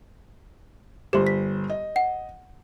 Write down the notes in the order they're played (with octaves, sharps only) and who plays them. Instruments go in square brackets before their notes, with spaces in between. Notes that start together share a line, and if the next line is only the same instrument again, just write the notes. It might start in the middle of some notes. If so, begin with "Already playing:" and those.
[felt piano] G1 C5 [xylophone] G4 C6
[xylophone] B6
[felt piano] D#5
[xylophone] F#5